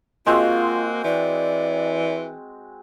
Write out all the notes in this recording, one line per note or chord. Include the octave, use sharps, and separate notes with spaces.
G#3 A#3 C4 F4 F#4
E3 D5